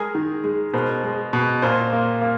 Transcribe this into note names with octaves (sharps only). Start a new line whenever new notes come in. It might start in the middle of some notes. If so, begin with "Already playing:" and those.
Already playing: G#3 G#4 A#4
D#3
G#3
B2 A#4 C5
G#3
B2
A#2 A#4 C5
A#3
A#3